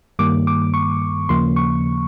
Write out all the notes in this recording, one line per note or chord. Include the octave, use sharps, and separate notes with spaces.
G2 D#3 G3 A#3 D6
D6
C#6
D#2 C#3 F3 A#3 C6
C#6